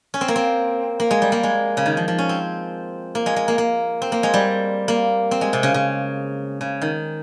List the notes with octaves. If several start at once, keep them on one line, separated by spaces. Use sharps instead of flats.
C#4
C4
A#3
C4
A#3
G#3
G3
A#3
G#3
C#3
D#3
F3
F3
C#4
C4
A#3
G#3
G#3
A#3
A#3
C4
A#3
G#3
G3
A#3
C4
G#3
C3
C#3
C#3
C#3
D#3